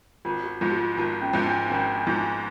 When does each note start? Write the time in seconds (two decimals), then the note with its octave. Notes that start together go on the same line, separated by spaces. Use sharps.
0.25 G#1 F4
0.43 F#4
0.61 G#2 F3 F4
0.71 F#4
0.79 F4
0.97 G#1 F4
1.22 C#4
1.33 G#2 F3 C#4
1.46 D4
1.66 D4
1.70 G#1 C#4
1.95 D4
2.07 G#2 F3 D#4
2.18 D4